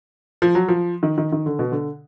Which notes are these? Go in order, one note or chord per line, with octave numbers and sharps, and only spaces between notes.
F3
F#3
F3
D#3
D#3
D#3
D3
B2
D3